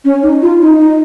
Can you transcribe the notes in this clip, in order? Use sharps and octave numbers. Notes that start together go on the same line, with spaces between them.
C#4
D#4
F4
D#4
D#4